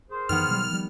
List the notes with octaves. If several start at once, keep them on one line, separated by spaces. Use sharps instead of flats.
G#4 A#4 C5
F#2 D#3 E3 B3 F6
B2 F#3 G3
F3 G3